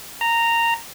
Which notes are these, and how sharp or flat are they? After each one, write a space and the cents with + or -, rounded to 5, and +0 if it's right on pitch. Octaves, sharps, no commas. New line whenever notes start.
A#5 -10